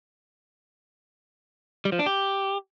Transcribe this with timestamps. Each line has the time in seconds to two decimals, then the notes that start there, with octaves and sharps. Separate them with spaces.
1.85 G3
1.92 F3
1.99 D4
2.06 G4